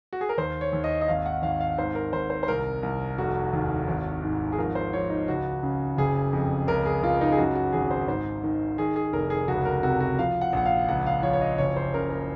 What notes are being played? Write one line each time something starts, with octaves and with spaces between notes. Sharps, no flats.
F#4
G#4
A#4
D#2 C5
C#5
D#2
D#5
D#5
G#1 F5
F#5
G#1 F5
F5
G#2 C5
A#4
G#1 C5
C5
C5
C2 A#4
C2
F1 F#4
D#2
G#1
G#2
G#4
F3 A#4
C5
F3 C#5
D#4
C#2 F#4
C#3
F#1 G#4
F2
C#2 A#4
G#4
C#2 F4
D#4
G#4
F#2 F#4
F#4
G#1 G#4
C5
G#2 C5
D#3
D#3 G#4
G#4
F1 A#4
G#4
C#2 F#4
A#4
C3 F#4
F#4
F3 F5
F#5
A#1 F#5
F5
C#2 F#5
F5
F3 C#5
C#5
D#5
F#1 C#5
C5
C#3 A#4
A#4